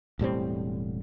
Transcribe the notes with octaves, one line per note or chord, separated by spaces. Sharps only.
E1 A2 G3 C4